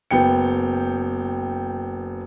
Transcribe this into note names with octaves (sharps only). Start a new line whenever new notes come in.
F#1 B3 G5 C#7